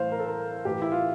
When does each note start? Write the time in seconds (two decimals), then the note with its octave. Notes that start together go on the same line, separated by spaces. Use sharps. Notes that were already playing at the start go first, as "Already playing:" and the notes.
Already playing: A2 E3 C5 F5
0.12 A#4
0.20 A4
0.27 A#4
0.65 A2 E3 G4
0.82 E4
0.92 F4